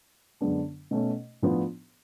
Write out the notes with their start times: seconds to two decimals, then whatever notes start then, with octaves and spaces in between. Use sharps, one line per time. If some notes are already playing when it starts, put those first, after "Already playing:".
0.41 F#2 D3 G#3 B3 D4
0.91 B2 A3 C#4
1.42 A2 F3 B3 D4